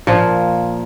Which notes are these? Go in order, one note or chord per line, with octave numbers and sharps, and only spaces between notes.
A#2 F3